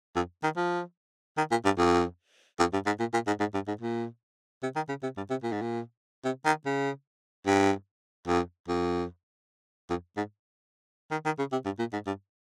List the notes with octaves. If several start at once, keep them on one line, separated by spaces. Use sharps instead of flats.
F2
D#3
F3
D#3
A#2
G2
F2
F2
G2
G#2
A#2
A#2
G#2
G#2
G2
G#2
A#2
C3
D#3
C#3
C3
G2
C3
A#2
G#2
A#2
C3
D#3
C#3
G2
F2
F2
F2
G#2
D#3
D#3
C#3
C3
G2
A#2
G#2
G2